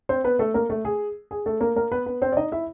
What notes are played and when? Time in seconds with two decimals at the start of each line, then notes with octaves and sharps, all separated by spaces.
0.09 C4 C5
0.24 B3 B4
0.39 A3 A4
0.54 A#3 A#4
0.70 A3 A4
0.85 G#4
1.31 G#4
1.46 A3 A4
1.60 A#3 A#4
1.76 A#3 A#4
1.92 B3 B4
2.06 B3 B4
2.22 C4 C5
2.32 D5
2.37 D#4 D#5
2.52 E4 E5